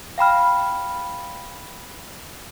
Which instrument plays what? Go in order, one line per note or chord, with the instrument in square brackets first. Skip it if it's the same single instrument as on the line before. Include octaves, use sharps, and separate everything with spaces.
[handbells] F5 G5 B5 F6